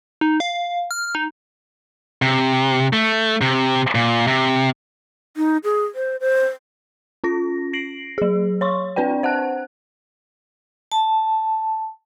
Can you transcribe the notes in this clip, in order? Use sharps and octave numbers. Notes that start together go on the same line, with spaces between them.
D#4
F5
F6
D#4
C3
A3
C3
A#2
C3
D#4
G#4
C5
C5
C#4 F4 A#6
A#6 C7 D7 F#7
F#3 G#4
C#5 C6 C#6
C4 D4 B4 D5 G5
C5 F#5 A5 F#6
A5